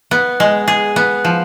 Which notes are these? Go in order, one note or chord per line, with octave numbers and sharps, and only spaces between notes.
B3
G#3
G#4
B3
F3